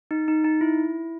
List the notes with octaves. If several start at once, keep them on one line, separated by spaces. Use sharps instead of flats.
D#4
D#4
D#4
E4